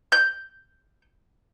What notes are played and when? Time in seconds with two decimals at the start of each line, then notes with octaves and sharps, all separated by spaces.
0.12 G6